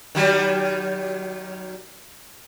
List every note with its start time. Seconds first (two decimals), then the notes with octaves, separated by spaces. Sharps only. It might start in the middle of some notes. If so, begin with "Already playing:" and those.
0.15 D#3 F#3 G3